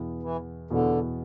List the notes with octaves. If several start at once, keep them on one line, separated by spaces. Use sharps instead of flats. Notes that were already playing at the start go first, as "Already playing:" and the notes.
Already playing: E2 B2 B3 E4
E3
E2 B2 D3 B3 E4